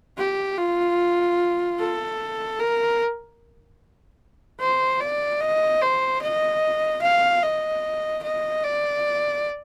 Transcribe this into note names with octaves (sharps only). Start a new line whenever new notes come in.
G4
F4
A4
A#4
C5
D5
D#5
C5
D#5
F5
D#5
D#5
D5